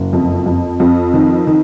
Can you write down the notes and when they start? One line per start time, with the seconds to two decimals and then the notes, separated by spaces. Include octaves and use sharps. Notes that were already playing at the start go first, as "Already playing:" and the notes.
Already playing: F#1
0.13 F2
0.46 F2
0.80 F2
1.14 D#3
1.47 D#3